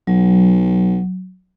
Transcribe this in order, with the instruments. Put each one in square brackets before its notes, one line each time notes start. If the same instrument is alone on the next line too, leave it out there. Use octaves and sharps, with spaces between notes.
[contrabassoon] B1 [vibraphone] F#3